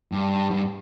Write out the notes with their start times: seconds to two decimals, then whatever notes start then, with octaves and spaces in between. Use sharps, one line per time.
0.12 G2
0.51 G2